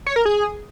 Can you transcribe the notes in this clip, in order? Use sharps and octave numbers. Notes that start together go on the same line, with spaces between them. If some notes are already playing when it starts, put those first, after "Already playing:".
C#5
A#4
G#4